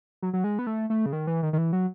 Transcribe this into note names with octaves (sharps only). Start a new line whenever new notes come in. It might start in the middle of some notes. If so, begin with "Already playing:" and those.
F#3
F#3
G#3
B3
A3
A3
C#3
D#3
E3
D#3
D#3
E3
F#3